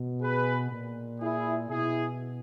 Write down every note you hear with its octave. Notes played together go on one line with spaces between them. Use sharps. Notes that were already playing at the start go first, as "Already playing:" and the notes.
Already playing: B2
G#4 B4
A#2
E4 G#4
B2 E4 G#4